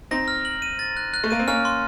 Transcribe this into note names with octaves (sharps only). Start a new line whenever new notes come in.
C4 D#4 A#6
F6
F#7
D#7
A6
F#6
F#6
A3
A#3 D#7
C4
A#3 C#4 F6
C6